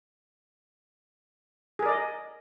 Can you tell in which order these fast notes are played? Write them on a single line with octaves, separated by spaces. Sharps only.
G#4 A#4 D5 D#5